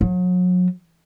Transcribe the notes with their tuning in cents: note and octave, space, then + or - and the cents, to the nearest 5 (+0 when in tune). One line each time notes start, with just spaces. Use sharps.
F#3 -35